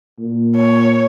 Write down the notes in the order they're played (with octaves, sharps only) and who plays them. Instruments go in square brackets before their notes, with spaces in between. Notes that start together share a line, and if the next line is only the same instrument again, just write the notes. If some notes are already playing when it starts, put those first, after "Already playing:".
[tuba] A#2
[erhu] C#5